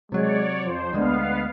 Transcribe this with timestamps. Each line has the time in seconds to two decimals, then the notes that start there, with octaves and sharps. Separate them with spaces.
0.12 C3 F#3 G#3 C#5 D5
0.65 F2 F3 C5
0.93 D2 G#3 B3 D4 F5